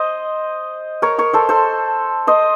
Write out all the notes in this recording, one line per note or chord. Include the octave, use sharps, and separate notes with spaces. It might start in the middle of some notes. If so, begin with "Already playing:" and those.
Already playing: C5 D#5
A#4 C#5
A#4 C#5
A4 C5
A4 C5
C5 D#5